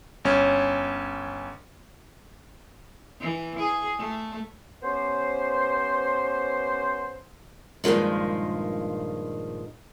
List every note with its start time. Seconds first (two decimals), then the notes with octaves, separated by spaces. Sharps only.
0.25 G1 C#4
3.20 E3
3.59 G#4
3.98 A3
4.83 B3 C#4 G4 B4 C5
7.84 G2 A#2 D#3 F3 G#3